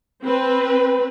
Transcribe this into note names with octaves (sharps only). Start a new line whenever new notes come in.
C4 B4